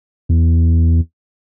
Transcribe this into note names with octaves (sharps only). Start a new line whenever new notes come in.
E2